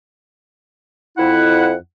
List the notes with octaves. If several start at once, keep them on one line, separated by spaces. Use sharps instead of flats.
F2 E4 F#5